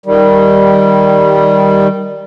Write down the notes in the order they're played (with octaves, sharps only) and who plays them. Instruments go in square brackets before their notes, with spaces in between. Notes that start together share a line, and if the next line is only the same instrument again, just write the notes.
[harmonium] D#3 G3